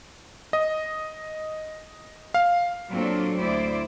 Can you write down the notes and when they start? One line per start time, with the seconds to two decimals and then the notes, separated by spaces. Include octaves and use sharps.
0.53 D#5
2.34 F5
2.91 A#2 F#3 C4 D4 F4 A4
3.39 D2 E4 C5 D5